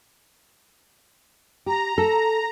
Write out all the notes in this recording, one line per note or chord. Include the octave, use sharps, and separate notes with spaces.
G4 A#5
A4